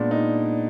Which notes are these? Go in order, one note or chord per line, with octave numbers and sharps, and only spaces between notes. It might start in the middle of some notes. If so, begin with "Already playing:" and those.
Already playing: A#2 G#3 B3 D4
D#4